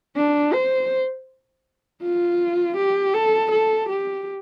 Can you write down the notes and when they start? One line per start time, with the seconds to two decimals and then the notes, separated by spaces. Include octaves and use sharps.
0.17 D4
0.54 C5
2.02 F4
2.77 G4
3.14 A4
3.51 A4
3.89 G4